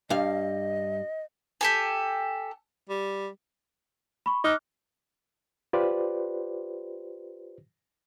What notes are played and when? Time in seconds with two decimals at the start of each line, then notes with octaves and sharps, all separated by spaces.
0.10 G2 D#5 F5
1.61 G4 A4 G#5
2.90 G3
4.26 B5 C#6
4.44 D#4 D6 F6 F#6
5.73 F4 G4 B4 C5 D5